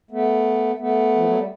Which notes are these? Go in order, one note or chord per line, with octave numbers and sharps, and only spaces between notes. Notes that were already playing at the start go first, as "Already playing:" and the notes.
A3 B3
A3 B3
F3
F#3
G3